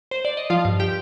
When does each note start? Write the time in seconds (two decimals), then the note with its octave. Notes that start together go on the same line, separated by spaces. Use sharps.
0.11 C5
0.25 D5
0.37 D#5
0.50 F3 F4 F5
0.65 G2
0.80 G4 G5